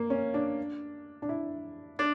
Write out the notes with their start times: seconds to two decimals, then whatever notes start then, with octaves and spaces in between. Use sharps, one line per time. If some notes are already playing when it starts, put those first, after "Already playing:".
Already playing: A#3
0.10 C#4
0.34 D4
1.22 D4
1.29 E4
1.99 D4